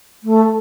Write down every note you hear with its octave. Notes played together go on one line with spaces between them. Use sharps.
A3